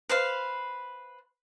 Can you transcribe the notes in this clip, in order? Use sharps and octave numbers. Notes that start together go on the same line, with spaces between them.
B4 C5 F5